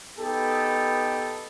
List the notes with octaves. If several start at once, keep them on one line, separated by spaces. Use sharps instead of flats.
B3 D#4 G4 A4